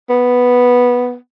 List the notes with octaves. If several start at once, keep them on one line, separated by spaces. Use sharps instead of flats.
B3